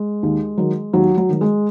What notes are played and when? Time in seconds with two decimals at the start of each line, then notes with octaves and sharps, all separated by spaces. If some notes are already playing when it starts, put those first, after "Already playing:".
Already playing: G#3
0.23 D#2
0.58 D#3 F#3
0.93 D#2 F#3
1.17 F#3
1.29 D#3 F#3
1.41 G#3